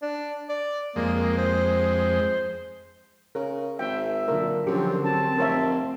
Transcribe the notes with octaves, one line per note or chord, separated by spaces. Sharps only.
D4
D5
F2 G#3 A#3
C5
C#3 A#4
G#1 E5 G5
A#2 D3 F#3 A#4
F#2 D3 F3 C4 G4
F#2 C4 A5
F1 A#4 C#5 E5